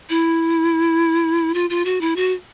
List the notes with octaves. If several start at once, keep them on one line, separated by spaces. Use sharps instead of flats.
E4
F4
F4
F#4
E4
F#4